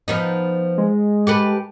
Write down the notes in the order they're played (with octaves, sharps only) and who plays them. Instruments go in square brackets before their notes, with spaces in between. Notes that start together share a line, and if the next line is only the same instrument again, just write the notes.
[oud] F3 B3 D#4
[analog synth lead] G#3
[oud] G4 A4 B4